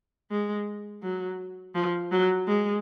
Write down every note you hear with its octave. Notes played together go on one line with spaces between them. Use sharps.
G#3
F#3
F3
F#3
G#3